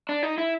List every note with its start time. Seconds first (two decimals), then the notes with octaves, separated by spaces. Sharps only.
0.09 D4
0.23 D#4
0.38 E4